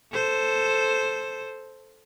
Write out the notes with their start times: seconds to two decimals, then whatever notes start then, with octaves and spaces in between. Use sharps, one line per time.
0.13 A4 C5